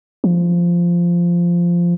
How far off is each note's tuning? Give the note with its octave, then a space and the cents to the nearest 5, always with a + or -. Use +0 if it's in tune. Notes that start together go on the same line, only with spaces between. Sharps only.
F3 -10